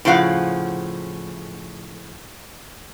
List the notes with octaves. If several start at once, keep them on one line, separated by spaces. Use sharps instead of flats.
A2 C#3 F3 F5 F#5